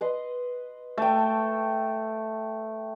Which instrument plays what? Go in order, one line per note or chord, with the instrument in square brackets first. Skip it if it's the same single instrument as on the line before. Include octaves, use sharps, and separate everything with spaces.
[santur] B4 D#5 C6
[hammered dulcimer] A3 [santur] G5 A5